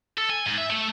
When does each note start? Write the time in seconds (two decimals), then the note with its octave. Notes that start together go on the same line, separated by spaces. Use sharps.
0.18 A4
0.30 G#5
0.46 G#2
0.58 E5
0.70 A3